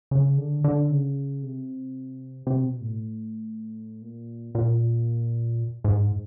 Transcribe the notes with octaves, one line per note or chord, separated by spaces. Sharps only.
C#3
D3
D3
C#3
C3
C3
B2
A2
A#2
A#2
G#2